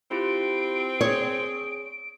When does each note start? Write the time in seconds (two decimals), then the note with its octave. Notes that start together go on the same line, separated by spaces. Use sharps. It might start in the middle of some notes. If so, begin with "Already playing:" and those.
0.11 C4 E4 F4 G4 D7
1.01 G#4 C#5